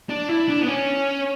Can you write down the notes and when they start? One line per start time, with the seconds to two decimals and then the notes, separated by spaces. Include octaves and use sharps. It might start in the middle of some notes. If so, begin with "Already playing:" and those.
0.09 D4
0.28 E4
0.48 D4
0.61 B3
0.67 C#4